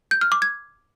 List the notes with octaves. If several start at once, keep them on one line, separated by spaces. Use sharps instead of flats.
G6
F6
D6
G#6